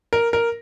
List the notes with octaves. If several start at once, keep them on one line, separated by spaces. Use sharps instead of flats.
A#4
A#4